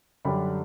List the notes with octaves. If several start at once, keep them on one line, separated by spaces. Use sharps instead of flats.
F#2 D3 G3 D4 G5 B5